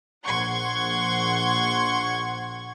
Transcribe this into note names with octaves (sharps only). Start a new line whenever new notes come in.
A#1 F#5 C6 C#6 G#6